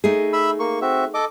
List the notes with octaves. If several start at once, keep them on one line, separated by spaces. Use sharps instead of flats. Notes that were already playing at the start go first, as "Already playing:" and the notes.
A3 D#4 G#4
E5 B5 E6
A#3 C#6
C4 F#4 E5
A4 D#5 D6